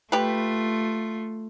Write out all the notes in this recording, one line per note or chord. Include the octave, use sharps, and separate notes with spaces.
A3 F4 G4 B4